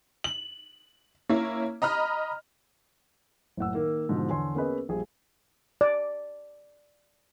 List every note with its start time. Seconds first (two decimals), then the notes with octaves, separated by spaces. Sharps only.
0.24 F#7
1.29 A#3 C#4 E4
1.82 D#5 A#5 B5 F6
3.57 F#1 A2 F#5 E6
3.74 D#3 A#3
4.09 G#2 B2 D3 F3
4.29 E2 D3 C#5 G#5 C6
4.55 A#3 B3 C#4 G#4 B4 D#5
4.89 A#1 G3 G#4
5.81 D5